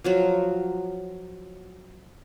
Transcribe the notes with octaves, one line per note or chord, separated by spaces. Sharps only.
F3 F#3 F#4